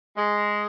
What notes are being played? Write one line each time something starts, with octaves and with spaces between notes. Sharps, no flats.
G#3